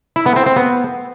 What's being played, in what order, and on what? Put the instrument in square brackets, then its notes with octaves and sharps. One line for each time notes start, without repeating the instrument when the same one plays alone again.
[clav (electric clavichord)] E4
B3
C4
C4
B3